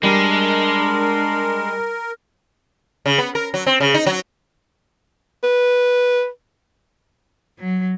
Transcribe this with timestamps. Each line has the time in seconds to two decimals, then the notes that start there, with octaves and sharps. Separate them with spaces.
0.03 G3 G#3 D4 A#4
3.06 C#3
3.18 B3
3.35 A#4
3.54 F#3
3.66 C4
3.80 C#3
3.94 D#4
4.06 F#3
5.43 B4
7.60 F#3